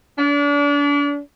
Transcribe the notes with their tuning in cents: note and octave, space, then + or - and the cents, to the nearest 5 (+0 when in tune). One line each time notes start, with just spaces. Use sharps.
D4 -35